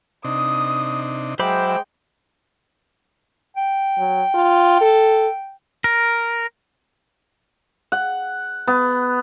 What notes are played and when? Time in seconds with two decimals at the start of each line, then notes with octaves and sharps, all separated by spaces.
0.24 C3 D4 D#4 D#6
1.39 F#3 G#3 C5 E5 G5 B5 D6
3.57 G5
3.98 F#3
4.34 F4
4.81 A4
5.84 A#4
7.92 F#5
8.68 B3